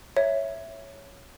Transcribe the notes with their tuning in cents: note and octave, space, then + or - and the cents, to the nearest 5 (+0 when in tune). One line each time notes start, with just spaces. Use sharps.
C#5 +0 E5 +0